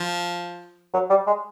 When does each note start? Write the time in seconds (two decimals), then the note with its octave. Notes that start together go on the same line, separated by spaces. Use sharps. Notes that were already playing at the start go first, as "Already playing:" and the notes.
Already playing: F3
0.94 F#3
1.10 G3
1.27 G#3